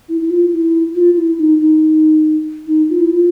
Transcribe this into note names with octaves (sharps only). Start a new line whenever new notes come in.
E4
E4
F4
E4
F4
E4
D#4
D#4
D#4
F4
E4
F4